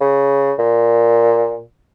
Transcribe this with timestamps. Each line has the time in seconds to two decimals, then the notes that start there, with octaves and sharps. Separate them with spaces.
0.01 C#3
0.59 A#2